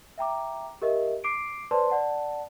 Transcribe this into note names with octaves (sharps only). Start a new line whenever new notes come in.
E5 G5 A#5 D6
G4 A#4 D#5 E5
D6 C7 D7
B4 C5 D5 A5 C6
D5 F#5 A5